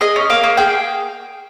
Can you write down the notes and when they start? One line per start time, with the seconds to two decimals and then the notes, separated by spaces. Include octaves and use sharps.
0.01 G#4 D#5
0.16 C#4
0.30 A#3 F5
0.43 A#3
0.57 G#4 G5